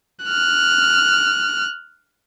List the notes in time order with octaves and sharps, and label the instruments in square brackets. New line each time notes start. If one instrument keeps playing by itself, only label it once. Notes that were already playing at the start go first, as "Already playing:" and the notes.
[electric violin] F6 F#6